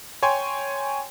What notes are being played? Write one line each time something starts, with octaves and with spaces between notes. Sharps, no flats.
C#5 G5 G#5 C6